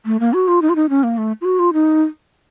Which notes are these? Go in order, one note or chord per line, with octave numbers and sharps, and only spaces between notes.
A3
A#3
F#4
F4
D#4
F4
D#4
C#4
A#3
A3
F4
F#4
F4
D#4